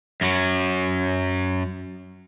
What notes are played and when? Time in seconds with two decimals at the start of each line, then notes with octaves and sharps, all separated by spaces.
0.21 F#2 F#3